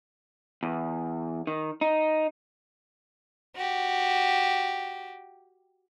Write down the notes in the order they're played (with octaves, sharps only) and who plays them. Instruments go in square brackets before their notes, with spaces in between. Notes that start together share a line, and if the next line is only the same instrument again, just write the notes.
[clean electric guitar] E2
D#3
D#4
[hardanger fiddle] F#4 G4